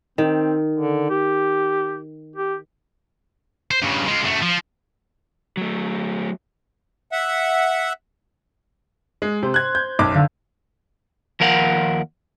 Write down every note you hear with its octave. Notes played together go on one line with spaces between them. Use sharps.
D#3 C4
D3
G4
G4
C5
G2 C#3
G#3 F4
F#2 A3
F3
F#3 A3
E5 F#5
G#3
C3 C5
F#6 G#6
G6
B1 F#2 D6
D3 F5
D#2 F3 A#4 F5 F#5